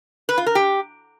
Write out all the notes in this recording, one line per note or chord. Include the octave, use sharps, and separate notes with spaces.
B4
F4
A#4
G4